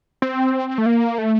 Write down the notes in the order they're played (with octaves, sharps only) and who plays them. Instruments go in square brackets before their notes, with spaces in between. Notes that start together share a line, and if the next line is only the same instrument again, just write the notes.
[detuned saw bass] C4
A3
A#3
A3